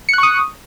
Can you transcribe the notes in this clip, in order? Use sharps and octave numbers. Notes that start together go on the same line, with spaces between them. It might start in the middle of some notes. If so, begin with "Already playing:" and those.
C#6 D#6 F#6 C#7